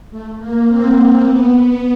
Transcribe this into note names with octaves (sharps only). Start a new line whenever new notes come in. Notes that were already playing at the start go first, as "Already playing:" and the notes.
A3
A#3
C4
C4
B3